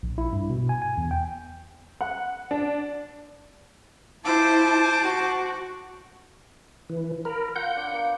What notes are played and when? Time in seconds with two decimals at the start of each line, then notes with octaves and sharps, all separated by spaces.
0.03 A#1
0.18 E4
0.33 G2
0.50 B2
0.69 G#5
0.82 G#5
0.97 E2
1.11 G5
2.01 F#5
2.51 D4
4.25 E4 F4 C5 A5 D6
5.02 F#4
6.90 E3
7.25 A#4 B5
7.56 F4 F#5 G6
7.76 D4
7.92 A#3 B3